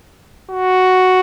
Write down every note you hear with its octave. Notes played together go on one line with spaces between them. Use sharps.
F#4